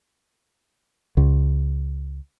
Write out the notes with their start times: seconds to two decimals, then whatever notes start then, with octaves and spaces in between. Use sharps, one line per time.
1.17 C#2